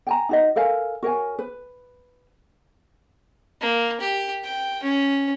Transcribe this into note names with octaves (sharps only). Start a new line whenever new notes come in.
G5 G#5 A#5
D#4 F#4 D#5
A4 A#4 F5 G#5
F#4 A#4 C#5 G#5
B4
A#3
G4
G5
C#4